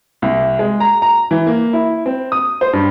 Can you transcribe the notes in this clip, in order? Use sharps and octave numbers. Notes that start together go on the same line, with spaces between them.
C2
G#3
A#5
A#5
E3
A#3
E4
C4
D#6
C5
G2